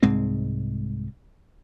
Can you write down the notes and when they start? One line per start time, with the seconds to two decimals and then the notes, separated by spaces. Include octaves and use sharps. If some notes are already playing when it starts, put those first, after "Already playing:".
0.03 C2 G#2 G#3 C4